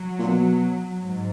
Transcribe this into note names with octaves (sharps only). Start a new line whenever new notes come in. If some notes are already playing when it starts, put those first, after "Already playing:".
Already playing: F#3
A#2
B2
G#2